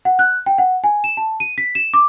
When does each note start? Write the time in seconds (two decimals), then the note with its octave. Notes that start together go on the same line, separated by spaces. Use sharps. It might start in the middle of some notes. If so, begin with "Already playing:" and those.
0.05 F#5
0.19 F#6
0.46 G5
0.58 F#5
0.84 G#5
1.04 E7
1.17 A5
1.40 D#7
1.58 B6
1.75 E7
1.94 D6